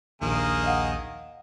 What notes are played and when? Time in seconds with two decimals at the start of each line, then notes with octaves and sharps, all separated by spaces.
0.22 A#1 D#2 D#3 A#3 G#4
0.64 D#5 F5 F#5